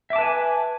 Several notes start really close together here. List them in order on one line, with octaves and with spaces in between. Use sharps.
E5 D6 A5 B4 G#5